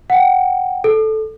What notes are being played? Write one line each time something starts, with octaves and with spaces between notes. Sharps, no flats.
F#5 G5
A4